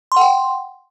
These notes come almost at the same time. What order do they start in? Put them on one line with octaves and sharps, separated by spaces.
C6 F#5 G5